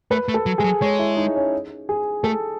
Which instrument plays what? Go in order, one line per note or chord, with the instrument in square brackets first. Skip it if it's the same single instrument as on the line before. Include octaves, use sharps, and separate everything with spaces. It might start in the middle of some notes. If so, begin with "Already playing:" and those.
[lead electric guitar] A3 [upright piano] B4
[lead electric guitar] A3
[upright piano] A4
[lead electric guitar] F#3
[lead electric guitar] G#3 [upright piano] G#4
[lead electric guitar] F#3
[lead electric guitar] G#3 [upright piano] C#5
[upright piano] E4
D#4
C#4
G#4
[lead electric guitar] A3 [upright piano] A4